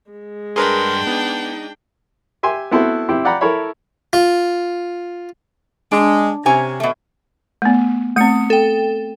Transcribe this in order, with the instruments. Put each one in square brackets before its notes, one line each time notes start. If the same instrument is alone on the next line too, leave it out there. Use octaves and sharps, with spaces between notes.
[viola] G#3
[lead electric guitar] G2 C6 [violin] D4 G5 [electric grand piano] G#4 A#4 B4
[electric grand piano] B3 [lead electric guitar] D#4
[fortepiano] G4 E5 G#5 C6
B3 C4 E4 F#4 A4 C5
C4 E4 G4
D5 F#5 G5 A#5 B5
E4 A4 A#4 C#5 B5
[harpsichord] F4
[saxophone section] G#3 [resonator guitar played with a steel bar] D4
[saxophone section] C3 [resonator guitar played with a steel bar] C#4 G#5 A#5
[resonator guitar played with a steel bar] B2 A3
[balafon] A3 B3
[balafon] A3 C4 [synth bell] D#6 C#7
[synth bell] A4 G5